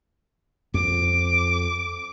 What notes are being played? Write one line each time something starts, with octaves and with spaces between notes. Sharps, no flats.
F2 D6